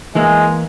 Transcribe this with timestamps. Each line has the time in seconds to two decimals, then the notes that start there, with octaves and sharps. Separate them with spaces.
0.15 E3 G#3 A#3 E4